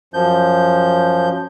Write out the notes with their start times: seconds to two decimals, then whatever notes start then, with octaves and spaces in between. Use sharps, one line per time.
0.14 F#2 F3 G6